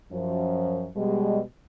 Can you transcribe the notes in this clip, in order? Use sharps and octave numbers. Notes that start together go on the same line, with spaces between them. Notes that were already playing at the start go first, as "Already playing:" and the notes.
F#2 F3
B2 G3 G#3